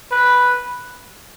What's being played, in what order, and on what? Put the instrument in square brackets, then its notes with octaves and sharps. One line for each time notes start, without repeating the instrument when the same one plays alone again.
[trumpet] B4